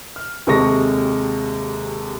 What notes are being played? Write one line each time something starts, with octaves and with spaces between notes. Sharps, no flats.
F6
D#2 C3 G#3 A4 C#6 A#6